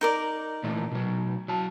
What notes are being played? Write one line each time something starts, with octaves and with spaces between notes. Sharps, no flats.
D#4 A#4 D5
A#2 E3 A3
B2 F#3
F#3 A5